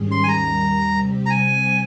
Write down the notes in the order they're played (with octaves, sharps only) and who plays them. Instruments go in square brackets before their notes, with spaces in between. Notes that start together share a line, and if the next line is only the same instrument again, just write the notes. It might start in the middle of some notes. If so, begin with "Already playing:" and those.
Already playing: [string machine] G#2 D#3 G3 C#4 G#4
[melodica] C6
G#5
[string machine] D#2 D#3 G3 [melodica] A#5
[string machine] C3 G3 C4 G4
[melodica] A#5
G#5